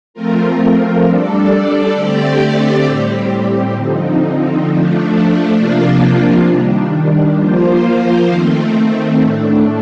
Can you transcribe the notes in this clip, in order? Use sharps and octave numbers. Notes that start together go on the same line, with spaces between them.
F3 A3 C4 F4 A#4
G3 D4 A4 D5
D3 A3 C4 G4 D5
A2 G3 C4 G4
D3 F3 C4 D#4
F3 A3 D4
C3 F3 A#3 D4 F4
D#3 G3 D4
F3 A#3 F4 C5
D#3 A3 C4
A2 A3 D4